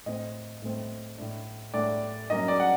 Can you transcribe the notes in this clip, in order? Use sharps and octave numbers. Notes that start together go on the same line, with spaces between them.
A2 A3 C4 D#5
A2 A3 C4
A2 A3 D4
A2 A3 D4 D5
F#2 F#3 A#3 D#4 D#5
D5
F#5